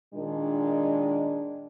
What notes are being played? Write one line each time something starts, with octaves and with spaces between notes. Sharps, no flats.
A#2 D#3 G#3 D4